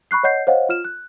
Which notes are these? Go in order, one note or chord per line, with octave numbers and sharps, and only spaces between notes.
B5 C#6 F#6 C7
C#5 D#5 F#5 G6 C7
C5 C#5 D#5 F5 F#5
F4 F6 E7
F#6